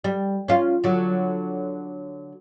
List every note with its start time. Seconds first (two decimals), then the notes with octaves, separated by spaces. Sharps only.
0.04 G3
0.48 C#4 F4
0.84 D3 F#3